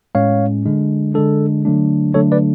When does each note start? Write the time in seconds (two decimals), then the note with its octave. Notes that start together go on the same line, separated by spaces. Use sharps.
0.15 A2 G#3 C#4 C#5 F5
0.66 D3 G#3 D4
1.14 D3 G#3 D4 A4
1.65 D3 F#3 A3 D4
2.14 D3 F#3 A3 D4 A4 C#5
2.32 B4 D5